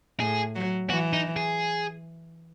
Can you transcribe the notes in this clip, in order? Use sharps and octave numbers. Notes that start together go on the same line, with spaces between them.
A2 G#4
F#3
E3 F#4
D#4
G#4